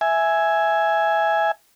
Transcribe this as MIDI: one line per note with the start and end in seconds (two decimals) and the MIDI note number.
0.01 1.51 76
0.01 1.51 80